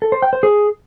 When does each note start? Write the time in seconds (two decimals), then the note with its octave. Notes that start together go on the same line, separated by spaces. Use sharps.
0.02 A4
0.12 C5
0.22 G5
0.33 C5
0.43 G#4